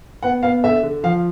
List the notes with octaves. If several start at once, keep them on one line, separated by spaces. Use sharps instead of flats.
B3 F#5
B3 F5
D3 E5
D3
F3 F5